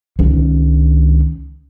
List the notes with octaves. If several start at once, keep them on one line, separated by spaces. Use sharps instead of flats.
C#2 D#3